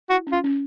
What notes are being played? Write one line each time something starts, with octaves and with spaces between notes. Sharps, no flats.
E4 F#4
C#4
F4
C#4